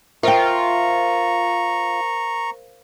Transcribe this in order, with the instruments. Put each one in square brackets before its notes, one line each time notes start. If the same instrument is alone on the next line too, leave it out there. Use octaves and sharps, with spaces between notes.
[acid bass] F4 [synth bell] A#4 C5 F5 [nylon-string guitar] E5 G5 [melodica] A#5 C#6